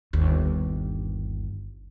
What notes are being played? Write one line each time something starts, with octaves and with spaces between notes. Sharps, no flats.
G1 D#2